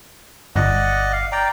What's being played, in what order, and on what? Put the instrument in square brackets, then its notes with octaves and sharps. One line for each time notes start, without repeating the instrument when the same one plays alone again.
[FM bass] G1 [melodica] D5 D#5 F#5
[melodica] F5
D5 G5 A#5